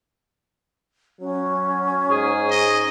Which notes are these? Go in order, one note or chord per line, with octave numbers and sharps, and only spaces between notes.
F#3 C#4
G#2 G#4
D#5